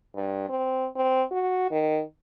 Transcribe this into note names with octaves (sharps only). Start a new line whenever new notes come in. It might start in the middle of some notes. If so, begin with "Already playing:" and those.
G2
C4
C4
F#4
D#3